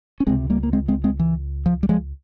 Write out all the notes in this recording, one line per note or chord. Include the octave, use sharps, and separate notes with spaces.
C#4
C#2 C3 G#3 C4
G3 A#3
A#3
G#3 C4
G#3 C4
G#3 C4
E3
F3
G3
F3 G#3